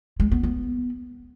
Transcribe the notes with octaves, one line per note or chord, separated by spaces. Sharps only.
G#3
B3
B3